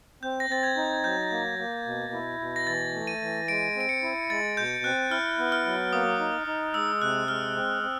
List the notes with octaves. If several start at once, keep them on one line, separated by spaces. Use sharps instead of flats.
C4 G6
A#6
C4 A6
G#6
D#4
F#3 G6
A#3
A#3
B2
E4
B2
A#6
E3 A6
A3
D#7
E3
G#3 D7
C4 D7
C#7
E4
G#3 A6
B2 G6
C4 F#6
E4 F6
B3
F6
F#3
A#3 D#6
D#4
D#4
G#3 E6
C3 F#6
G#3 F6
C4
C4